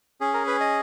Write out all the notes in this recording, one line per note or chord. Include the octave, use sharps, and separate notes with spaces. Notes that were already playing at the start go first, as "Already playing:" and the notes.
C#4 G#4
A#4
B4
D#5